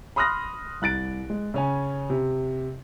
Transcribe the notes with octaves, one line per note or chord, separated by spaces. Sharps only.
B5 C6 D#6 F6 F#6 A#6
C2 F#6 A6 D7
G#3
C#3 C#4 G#5
C3